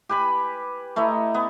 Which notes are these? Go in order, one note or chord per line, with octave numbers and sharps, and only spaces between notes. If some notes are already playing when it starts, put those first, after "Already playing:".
G4 B4 G#5 B5
A3 E4 D#5 A#5
B3